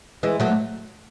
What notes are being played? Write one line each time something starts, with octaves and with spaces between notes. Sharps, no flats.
E3 G#3
F#3 A3